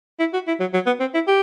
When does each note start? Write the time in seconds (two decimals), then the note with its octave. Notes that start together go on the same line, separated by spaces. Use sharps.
0.19 E4
0.33 F#4
0.47 E4
0.60 F#3
0.74 F#3
0.86 B3
1.00 C4
1.14 E4
1.27 G4